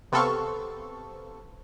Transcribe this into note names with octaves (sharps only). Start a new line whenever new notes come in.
C3 B3 C4 A4 F5 C#6